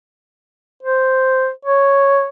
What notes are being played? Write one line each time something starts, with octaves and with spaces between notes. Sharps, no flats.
C5
C#5